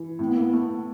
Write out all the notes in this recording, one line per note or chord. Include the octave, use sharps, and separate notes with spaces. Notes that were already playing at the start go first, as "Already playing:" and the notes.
Already playing: E3
A2 C4
B3
A#3
B3
A3